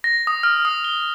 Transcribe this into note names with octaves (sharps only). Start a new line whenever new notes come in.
A#6
D#6
F6
D#6
G7